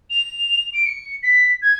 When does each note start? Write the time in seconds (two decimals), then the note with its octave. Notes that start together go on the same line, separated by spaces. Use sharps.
0.10 F7
0.73 D7
0.86 C#7
1.23 B6
1.62 G#6